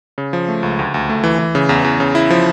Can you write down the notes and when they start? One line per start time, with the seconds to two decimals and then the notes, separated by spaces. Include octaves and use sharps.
0.18 C#3
0.33 F3
0.49 A3
0.63 C#2
0.79 D2
0.94 D2
1.09 A3
1.24 E3
1.39 E3
1.55 C#3
1.69 E2
1.84 E2
2.00 C#3
2.15 E4
2.30 F3